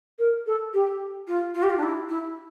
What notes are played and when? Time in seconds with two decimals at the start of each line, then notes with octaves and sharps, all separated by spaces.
0.19 A#4
0.47 A4
0.74 G4
1.27 F4
1.54 F4
1.63 G4
1.70 F4
1.78 D4
1.83 E4
2.09 E4